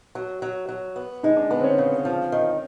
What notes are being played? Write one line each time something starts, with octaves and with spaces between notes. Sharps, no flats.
F#3
F#3
F#3
B3
G#3 D#4
D4
B3 D4
C4
C#4
C#3 C4
F3
D#3